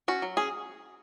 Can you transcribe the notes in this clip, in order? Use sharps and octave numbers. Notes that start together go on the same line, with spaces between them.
C#4 F#4
F#3
C#4 G#4